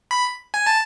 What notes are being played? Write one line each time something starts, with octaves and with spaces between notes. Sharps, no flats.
B5
G#5
A5